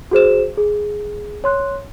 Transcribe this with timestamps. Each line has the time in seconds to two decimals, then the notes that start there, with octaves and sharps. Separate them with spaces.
0.11 F#4 G#4 C5 E7
0.57 G#4
1.44 C#5 C6 F#6